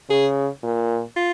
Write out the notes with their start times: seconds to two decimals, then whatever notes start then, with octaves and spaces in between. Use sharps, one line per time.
0.10 C#3 G#4
0.63 A#2
1.16 F4